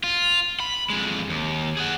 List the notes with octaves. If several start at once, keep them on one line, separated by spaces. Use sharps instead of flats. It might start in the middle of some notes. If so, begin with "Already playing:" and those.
F4
B5
F2 G#3
D#2
G#4 F#5